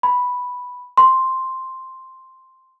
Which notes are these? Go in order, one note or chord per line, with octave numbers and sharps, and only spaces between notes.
B5
C6